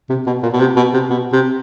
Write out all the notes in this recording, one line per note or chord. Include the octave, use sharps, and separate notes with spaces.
C3
B2
A#2
B2
C3
B2
C3
B2
C3